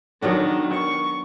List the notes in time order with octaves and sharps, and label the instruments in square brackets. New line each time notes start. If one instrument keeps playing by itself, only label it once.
[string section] D#3 [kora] F#3 B3 D4
[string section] C#6